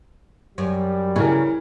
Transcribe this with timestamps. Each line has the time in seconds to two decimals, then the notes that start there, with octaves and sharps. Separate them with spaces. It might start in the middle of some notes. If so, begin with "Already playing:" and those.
0.58 F#2 G3
1.16 C#3 E3 A#4